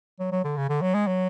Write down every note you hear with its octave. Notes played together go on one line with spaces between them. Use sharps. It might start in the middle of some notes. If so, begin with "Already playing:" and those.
F#3
F#3
D3
C#3
D3
F#3
G#3
F#3